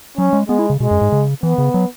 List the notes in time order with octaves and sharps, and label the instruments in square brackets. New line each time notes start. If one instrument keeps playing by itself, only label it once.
[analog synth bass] F#3 [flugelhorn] C#4
[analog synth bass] G#3
[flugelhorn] G#3 [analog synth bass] B3
[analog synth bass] E4
C#3
[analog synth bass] B2 [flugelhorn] G#3
[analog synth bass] F#2
G#2
C#3
[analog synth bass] E3 [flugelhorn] B3
[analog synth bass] C#3
F#3